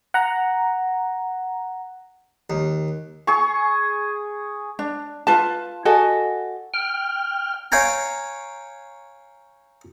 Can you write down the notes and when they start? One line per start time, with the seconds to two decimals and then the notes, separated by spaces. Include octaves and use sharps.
0.14 F#5 A#5
2.50 D#2
3.27 G#4 C#6
4.79 D4
5.27 F4 B4 A5
5.85 F#4 A4 D#5 G#5
6.74 G5 F6
7.72 C#5 F5 G5 G#5 A#5